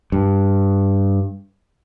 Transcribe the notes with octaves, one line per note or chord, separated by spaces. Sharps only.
G2